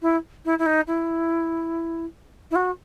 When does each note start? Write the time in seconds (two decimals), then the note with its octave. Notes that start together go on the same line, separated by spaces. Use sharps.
0.02 E4
0.45 E4
0.59 E4
0.66 D#4
0.87 E4
2.51 E4
2.55 F#4